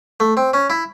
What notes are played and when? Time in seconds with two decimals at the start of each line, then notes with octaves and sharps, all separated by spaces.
0.20 A3
0.37 C4
0.54 C#4
0.70 E4